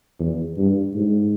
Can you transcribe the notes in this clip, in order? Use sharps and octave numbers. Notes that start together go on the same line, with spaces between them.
E2
G2
G#2